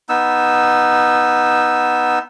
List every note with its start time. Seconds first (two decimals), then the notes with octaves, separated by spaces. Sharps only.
0.09 B3 D#4 E6